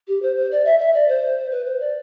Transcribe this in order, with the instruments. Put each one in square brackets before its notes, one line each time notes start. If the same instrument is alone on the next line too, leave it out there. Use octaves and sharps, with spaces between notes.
[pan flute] G4
C5
C5
D5
E5
E5
D5
C5
B4
C5
D5